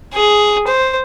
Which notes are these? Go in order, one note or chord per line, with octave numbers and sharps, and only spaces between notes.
G#4
C5